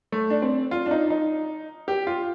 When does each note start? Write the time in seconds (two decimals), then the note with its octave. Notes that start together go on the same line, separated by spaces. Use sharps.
0.12 A3
0.30 D4
0.42 C4
0.71 F4
0.86 D4
0.91 D#4
1.10 D#4
1.88 G4
2.07 F4